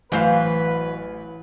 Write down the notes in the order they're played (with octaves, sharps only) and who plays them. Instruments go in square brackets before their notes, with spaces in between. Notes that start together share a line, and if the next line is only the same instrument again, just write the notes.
[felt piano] A1 [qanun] E3 [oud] F#3 C5 F5 [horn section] B4